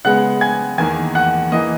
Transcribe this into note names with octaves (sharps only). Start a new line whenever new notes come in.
C#3 G#3 B3 F#5 F#6
G#5 G#6
E2 D#3 A#3 G#5 G#6
F#5 F#6
E3 A#3 D#5 D#6